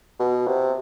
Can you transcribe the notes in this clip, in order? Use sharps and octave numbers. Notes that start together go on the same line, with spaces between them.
B2
C3